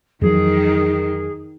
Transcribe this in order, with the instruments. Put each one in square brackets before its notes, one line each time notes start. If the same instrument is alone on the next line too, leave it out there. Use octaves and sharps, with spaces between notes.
[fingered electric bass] F2 E3 F#3 [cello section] D#3 [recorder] G#4